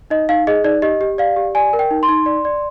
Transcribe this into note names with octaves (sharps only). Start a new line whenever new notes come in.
D#4 D#5
D#4 F5
G#4 D#5
D#4 D5
G4 D#5
G4
D5 F5
G4
D5 G#5
A#4
G5
D#4
C6
D#4
D5
D5